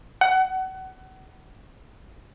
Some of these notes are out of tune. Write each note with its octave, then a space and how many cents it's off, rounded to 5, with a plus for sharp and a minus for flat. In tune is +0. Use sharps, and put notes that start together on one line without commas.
F#5 +25